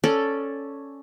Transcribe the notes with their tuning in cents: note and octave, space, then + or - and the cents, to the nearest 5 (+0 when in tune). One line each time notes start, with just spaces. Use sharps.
C#4 +0 A4 +0 D5 +0